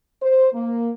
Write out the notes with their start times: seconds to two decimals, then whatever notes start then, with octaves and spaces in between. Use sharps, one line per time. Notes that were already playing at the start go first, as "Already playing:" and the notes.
0.23 C5
0.53 A#3